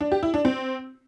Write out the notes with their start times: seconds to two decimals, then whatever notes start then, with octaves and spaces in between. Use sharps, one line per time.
0.01 D4
0.12 G4
0.23 E4
0.34 D4
0.45 C4